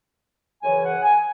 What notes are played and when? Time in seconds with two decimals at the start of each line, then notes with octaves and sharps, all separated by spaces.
0.62 F#2 C#3 E3 G#5
0.82 F#5
1.02 G#5